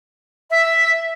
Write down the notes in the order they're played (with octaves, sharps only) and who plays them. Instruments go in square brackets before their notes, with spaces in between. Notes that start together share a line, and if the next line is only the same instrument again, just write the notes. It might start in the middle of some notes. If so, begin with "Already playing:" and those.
[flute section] E5